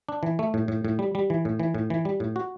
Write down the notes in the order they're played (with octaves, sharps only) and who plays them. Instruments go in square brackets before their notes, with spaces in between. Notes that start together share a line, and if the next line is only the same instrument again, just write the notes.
[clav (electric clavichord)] D4
E3
A3
A2
A2
A2
G3
G3
E3
A2
E3
A2
E3
G3
A2
F#4